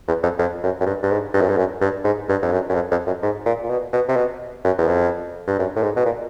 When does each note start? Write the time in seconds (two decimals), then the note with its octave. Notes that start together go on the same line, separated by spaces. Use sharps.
0.08 E2
0.23 F2
0.39 F2
0.63 F#2
0.80 F#2
0.86 G2
1.03 G2
1.11 G#2
1.34 G2
1.41 F#2
1.49 G2
1.57 F#2
1.81 G2
2.04 G#2
2.29 G2
2.42 F2
2.52 F#2
2.69 F#2
2.75 F2
2.91 F2
3.07 F#2
3.23 G#2
3.46 A#2
3.64 A#2
3.70 B2
3.93 B2
4.08 C3
4.16 B2
4.64 F#2
4.78 E2
4.87 F2
5.47 G2
5.59 F#2
5.76 A2
5.83 G#2
5.96 B2
6.05 A#2